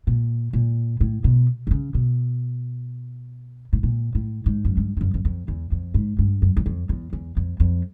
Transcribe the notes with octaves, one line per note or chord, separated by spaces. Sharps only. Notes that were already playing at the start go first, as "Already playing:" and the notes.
A#2
A#2
A2
B2
C3
C#3
B2
A2
A#2
A2
G#2
F#2
G2
G2
F#2
F#2
F2
E2
F2
G#2
G2
F#2
E2
F2
E2
E2
F2
F2